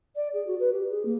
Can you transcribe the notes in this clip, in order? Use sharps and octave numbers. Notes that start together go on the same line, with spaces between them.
D5
G#4
F#4
B4
G4
G#4
A#3